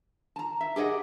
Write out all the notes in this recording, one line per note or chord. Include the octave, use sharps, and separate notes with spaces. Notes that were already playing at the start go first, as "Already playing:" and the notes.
A5 A#5
E5
G4 G#4 C5 D#5 F#5